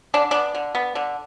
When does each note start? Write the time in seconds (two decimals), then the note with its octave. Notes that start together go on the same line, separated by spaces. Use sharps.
0.14 D3 D4
0.31 B3 D4
0.55 D3
0.75 B3
0.95 D3